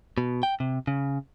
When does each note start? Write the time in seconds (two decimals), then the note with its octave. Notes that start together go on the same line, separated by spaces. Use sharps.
0.18 B2
0.43 G5
0.60 C3
0.87 C#3